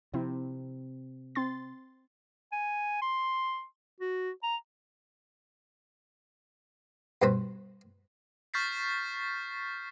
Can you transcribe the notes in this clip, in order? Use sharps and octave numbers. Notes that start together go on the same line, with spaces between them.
C3 F3 C4 E4
C4 C6 A6
G#5
C6
F#4
A#5
G2 B2 C4 B4 C5 B5
C#6 F6 G6 A6 B6 C7